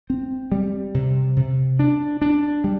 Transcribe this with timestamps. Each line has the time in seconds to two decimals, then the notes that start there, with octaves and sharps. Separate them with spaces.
0.10 C4
0.52 G3
0.94 C3
1.37 C3
1.79 D4
2.22 D4
2.64 G3